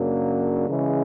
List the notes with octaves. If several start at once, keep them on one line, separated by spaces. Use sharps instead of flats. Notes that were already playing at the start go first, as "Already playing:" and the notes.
Already playing: F#2 C#3 F#3 A#3 D4
C#3 E3 G#3 C#4